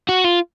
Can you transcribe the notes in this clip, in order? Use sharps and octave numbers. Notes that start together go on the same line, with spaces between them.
F#4
F4